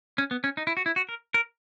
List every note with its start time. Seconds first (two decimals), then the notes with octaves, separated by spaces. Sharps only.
0.18 C#4
0.31 B3
0.44 C#4
0.57 D#4
0.67 E4
0.77 F#4
0.86 E4
0.96 F#4
1.09 A#4
1.34 A#4